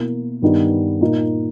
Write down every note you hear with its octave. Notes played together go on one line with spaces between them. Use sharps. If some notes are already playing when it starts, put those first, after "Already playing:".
Already playing: B2 A#3 E4
G2 D#3 G3 B3 D#4
A#2 A#3 D#4